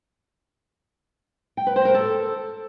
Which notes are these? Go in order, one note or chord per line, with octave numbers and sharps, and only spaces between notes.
G5
B4
C5
A#4
A4